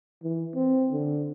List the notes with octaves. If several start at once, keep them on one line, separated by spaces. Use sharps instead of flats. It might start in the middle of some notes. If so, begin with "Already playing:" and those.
E3
C4
D3